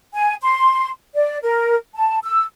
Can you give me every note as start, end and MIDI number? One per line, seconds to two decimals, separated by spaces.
0.14 0.34 80
0.43 0.89 84
1.15 1.38 74
1.42 1.76 70
1.95 2.19 81
2.24 2.44 88